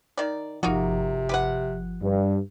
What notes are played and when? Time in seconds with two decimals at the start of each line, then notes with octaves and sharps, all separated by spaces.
0.17 D#3 D5
0.63 G1 C3 F3 A#3 D#4 F#4
1.29 G4 B4 F#5
2.01 G2